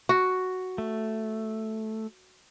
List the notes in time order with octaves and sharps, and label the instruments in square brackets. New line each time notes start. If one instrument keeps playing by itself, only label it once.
[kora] F#4
[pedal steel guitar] A3